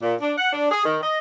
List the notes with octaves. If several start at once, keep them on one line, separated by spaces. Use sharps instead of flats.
A#2
D4
F#5
D4
G#4
D#3
D#5